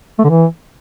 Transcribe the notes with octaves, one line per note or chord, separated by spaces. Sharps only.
A3
D3
E3